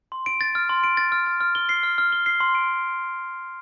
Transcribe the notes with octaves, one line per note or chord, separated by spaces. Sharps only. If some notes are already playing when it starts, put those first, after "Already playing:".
C6
D7
A6
F6
C6
D7
A6
F6
F6
F6
G7
C7
F6
F6
G7
C7
C6
D7